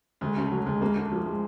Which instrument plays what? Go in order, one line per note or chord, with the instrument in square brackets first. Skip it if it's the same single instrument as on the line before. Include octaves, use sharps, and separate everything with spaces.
[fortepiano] D2 [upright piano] G#3
[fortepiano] C#3 [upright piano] A3
[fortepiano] F#3 [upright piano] A3
[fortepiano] D2 [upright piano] G#3
[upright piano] G#3 [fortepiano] A#3
[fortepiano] D3 [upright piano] A3
[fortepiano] F3 [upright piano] A3
[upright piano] G#3